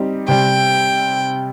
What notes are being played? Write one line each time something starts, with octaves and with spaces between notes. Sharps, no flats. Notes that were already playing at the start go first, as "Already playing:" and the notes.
Already playing: G3 C4 D#4 G4
C3 G3 C4 G5